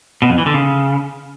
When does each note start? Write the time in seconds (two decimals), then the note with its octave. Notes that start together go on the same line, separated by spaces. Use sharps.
0.22 B2
0.30 F2
0.38 E3
0.46 D3
0.54 C#3